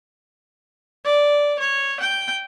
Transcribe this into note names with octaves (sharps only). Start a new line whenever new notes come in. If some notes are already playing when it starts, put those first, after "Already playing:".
D5
C#5
G5